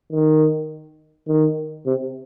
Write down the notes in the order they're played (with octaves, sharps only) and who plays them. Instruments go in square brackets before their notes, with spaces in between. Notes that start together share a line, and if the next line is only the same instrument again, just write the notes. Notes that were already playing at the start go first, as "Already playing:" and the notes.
[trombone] D#3
D#3
C3